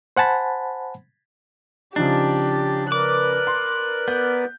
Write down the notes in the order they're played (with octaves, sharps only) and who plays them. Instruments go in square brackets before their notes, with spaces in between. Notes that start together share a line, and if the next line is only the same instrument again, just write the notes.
[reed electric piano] C5 F#5 G#5 A5 B5
[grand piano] C#3 F3 D#4 [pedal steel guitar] D4 [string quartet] G4
[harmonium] A#4 B4 D5 [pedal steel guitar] D6 [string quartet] F#6
[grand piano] C6
[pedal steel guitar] B3 [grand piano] G6